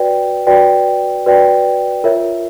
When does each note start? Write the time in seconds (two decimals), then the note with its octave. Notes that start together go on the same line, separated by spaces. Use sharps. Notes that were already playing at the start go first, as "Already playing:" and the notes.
Already playing: F#4 B4 D5 G5
0.47 F#4 B4 D5 G5
1.26 F#4 B4 D5 G5
2.04 F4 A#4 C#5 E5